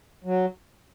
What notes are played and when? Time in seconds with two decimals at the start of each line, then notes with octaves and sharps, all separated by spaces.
0.24 F#3